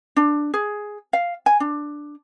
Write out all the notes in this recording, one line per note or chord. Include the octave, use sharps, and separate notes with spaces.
D4
G#4
F5
G#5
D4